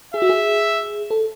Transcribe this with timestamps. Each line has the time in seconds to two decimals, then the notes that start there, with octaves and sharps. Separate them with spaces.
0.14 G#4 E5
0.22 F#4
0.29 G#4
1.11 A4